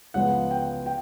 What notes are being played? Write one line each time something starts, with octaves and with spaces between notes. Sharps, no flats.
C#2 C#3 F3 G#3 B3 F#5
G5
G5